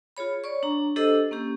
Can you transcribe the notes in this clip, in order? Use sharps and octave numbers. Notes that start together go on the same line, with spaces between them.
F4 G#4 C#5 B5
C#5 D5 C#6
D4 A#5
D4 G4 A4 C5 D#5 E6
A#3 C#4 G4